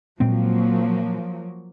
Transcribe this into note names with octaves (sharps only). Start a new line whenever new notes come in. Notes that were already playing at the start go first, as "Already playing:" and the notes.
A#2 F3 F#3 G#3 A#3 C4